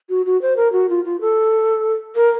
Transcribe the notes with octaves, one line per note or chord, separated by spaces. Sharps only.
F#4
F#4
C5
A#4
F#4
F4
F4
A4
A#4